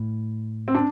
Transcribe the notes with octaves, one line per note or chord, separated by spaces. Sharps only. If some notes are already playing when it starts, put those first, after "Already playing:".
Already playing: A2
C4
D4